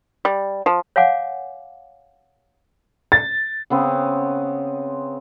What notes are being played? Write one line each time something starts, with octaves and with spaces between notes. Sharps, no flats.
G3
F3
C#5 F5 F#5 G#5 D6
A6
C#3 B3 C4